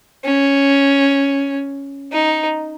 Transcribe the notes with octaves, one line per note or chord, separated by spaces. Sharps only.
C#4
D#4